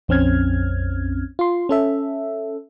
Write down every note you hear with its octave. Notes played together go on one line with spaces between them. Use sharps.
A#1 F2 C4 C#4 F6 G#6
F4 C6
C#4 A4 E5